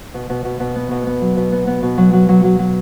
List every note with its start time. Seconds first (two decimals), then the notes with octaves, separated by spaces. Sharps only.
0.14 B2
0.30 B2
0.45 B2
0.60 B2
0.76 B3
0.91 B2
1.07 B3
1.21 F#3
1.37 B2
1.52 B3
1.67 B3
1.83 B2
1.98 F#3
2.13 F#3
2.29 F#3
2.44 F#3
2.59 F#3